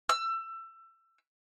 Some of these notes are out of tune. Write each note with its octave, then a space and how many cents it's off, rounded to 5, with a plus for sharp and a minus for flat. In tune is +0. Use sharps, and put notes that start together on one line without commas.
E6 +25